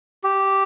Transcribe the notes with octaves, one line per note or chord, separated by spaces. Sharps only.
G4